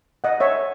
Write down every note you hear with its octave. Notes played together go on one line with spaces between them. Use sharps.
D#5 F#5
C#5 E5